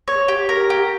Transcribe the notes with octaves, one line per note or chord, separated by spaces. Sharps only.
C#5
G4
A#4
G4